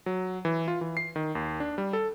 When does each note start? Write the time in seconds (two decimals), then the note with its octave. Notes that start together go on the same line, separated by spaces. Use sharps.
0.06 F#3
0.45 E3
0.68 F4
0.81 E3
0.97 C7
1.16 D#3
1.35 D#2
1.60 D4
1.78 G3
1.93 A4